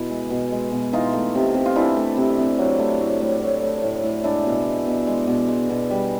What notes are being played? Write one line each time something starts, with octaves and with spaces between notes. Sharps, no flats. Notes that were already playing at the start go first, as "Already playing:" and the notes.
Already playing: B2 E4
G#3
B2
G#3
B2
E3 D#4 F4
A3
C3
C3
F4
E3 D4 E4
A3
C3
C3
F#3
A3
A2
A2
F#3
A3
A2
A2
G#3 D4 E4
B2
G#3
B2
G#3
B2
G#3
B2
G3